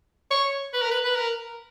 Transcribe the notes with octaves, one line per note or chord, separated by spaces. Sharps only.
C#5
B4
A#4
B4
B4
A#4